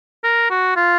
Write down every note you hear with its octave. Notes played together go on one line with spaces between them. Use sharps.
A#4
F#4
F4